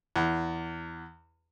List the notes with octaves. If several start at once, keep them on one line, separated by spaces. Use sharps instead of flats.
E2